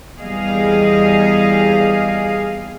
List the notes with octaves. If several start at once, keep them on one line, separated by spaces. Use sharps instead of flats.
E2 G3 G#4 D#5 F5